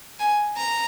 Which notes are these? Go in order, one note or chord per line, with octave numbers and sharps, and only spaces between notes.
G#5
A#5